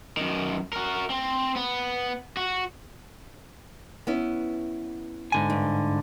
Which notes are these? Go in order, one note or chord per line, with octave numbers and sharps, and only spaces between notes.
F#2 D#3
F#4 A#4
C4
B3
F#4
B3 C#4 E4
G#2 D3 G#5
G2